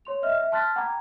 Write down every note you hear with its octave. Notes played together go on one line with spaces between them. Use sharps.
C#5 C6 F7
D#5 E5 F6
E5
A5 C6 F6 F#6 A6 B6
F#5 G5 A#5 B5 D6 G#6